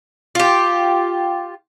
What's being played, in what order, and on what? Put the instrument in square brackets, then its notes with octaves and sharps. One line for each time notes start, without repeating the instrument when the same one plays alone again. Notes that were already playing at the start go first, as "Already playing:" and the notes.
[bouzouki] F4 G4